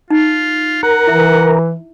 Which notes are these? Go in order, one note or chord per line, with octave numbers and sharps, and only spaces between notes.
D#4 F4
A#4 F#5
E3 E4 E5